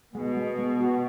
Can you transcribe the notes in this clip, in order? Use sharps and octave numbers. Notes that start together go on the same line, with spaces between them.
B2 G#3
G#3
G#3
F#4